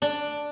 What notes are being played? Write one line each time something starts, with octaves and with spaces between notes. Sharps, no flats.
D4